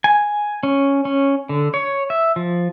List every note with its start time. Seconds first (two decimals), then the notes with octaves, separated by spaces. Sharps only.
0.04 G#5
0.63 C#4
1.05 C#4
1.49 D3
1.74 C#5
2.10 E5
2.36 F3